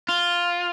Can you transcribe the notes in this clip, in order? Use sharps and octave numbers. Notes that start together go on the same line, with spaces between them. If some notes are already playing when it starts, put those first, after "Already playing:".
F4